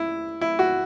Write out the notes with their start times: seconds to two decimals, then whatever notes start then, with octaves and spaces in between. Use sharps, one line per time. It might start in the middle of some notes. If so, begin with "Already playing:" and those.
Already playing: E4
0.41 E4
0.59 F#4